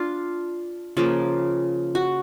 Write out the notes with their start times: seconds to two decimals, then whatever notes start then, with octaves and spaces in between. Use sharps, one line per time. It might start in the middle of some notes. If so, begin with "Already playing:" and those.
Already playing: D4 F4
0.97 C#3 F3 A#3 F4
1.95 F#4